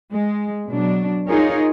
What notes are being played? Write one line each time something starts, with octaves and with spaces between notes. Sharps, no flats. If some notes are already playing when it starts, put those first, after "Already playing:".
G#3
B2 F#3 D4
D#4 F4 G#4 A#4 C#5